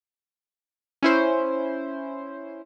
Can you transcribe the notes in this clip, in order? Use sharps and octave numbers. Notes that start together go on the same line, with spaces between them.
C#4 E4 C5